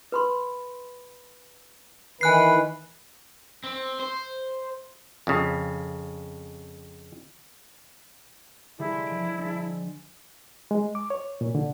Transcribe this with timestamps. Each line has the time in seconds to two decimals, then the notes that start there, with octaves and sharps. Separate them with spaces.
0.12 B4 B5 C6
2.21 D#3 E3 B4 G#5 F#6 C7
3.64 C4
4.00 C5
5.27 F2 C#3
8.79 D3 G3 G#3 E4
8.94 C6
9.06 F3 D7
9.38 G#3 D4
10.71 G#3
10.95 D6
11.10 C#5
11.41 A#2
11.55 D3